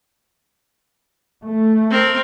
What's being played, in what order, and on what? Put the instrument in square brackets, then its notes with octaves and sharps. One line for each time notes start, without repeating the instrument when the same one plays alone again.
[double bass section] A3
[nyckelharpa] C4 A#4